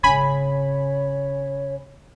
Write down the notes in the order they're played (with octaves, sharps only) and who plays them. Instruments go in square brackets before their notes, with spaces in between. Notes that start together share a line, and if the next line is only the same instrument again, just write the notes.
[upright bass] G#1 C#3 [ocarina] C#5 [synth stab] G#5 B5